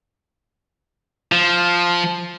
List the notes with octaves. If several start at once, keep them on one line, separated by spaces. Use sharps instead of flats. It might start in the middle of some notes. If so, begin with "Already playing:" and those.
F3